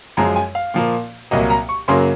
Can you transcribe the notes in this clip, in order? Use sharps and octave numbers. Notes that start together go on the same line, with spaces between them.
F#2 F3 G#3 A#5
G#5
F5
A#2 F3 A#3
C2 A#2 F#3 A#3 D#5
A#5
C#6
F#2 C#3 F#3 A#3 C6